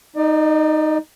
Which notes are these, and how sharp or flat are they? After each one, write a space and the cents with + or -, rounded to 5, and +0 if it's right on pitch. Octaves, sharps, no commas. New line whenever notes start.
D#4 +0 D5 +35